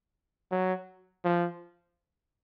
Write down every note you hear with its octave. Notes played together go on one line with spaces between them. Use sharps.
F#3
F3